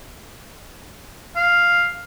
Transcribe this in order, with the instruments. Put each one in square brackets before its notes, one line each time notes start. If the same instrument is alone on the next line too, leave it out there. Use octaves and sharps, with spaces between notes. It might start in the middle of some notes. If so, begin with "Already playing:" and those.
[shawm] F5